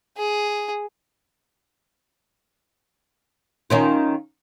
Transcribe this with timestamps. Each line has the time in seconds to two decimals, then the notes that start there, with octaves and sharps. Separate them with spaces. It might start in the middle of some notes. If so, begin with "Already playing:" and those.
0.17 G#4
3.70 D#3 C#4 F4